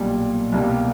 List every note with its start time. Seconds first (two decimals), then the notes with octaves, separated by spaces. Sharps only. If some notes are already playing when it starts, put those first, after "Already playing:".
Already playing: B1 A#2 G3
0.52 C2 B2 G3 A#3